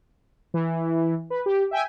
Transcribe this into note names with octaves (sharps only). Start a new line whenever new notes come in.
E3
B4
G4
E5 G5 G#5